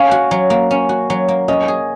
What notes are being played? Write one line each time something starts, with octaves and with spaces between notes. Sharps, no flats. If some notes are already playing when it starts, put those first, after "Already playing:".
Already playing: C#4 F5
F#4
F#3
A#3
C#4
F#4
F#3
A#3
C#4 D#5
G#4